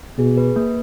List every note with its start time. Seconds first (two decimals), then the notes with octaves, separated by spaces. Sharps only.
0.18 B2 G#4
0.37 B4
0.56 A#3